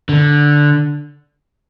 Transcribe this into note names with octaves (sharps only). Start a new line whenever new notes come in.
D3